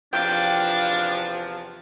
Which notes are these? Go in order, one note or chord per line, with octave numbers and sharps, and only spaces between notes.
E2 C3 F3 D4 F5 G5